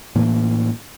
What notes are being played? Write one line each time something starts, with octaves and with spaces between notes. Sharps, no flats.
A2 E3 A#3